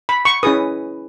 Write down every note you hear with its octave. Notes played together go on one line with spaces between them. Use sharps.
B5
C#6
C#4 E4 G#4 B4 D#6